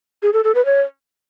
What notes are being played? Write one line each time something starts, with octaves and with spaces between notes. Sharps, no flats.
G#4
A4
A4
B4
C#5